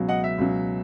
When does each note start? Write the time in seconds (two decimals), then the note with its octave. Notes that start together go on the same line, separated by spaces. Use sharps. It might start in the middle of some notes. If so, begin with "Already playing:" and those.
Already playing: C#2 B2 F#3
0.09 D#5 F#5
0.24 E5
0.38 C#2 B2 F#3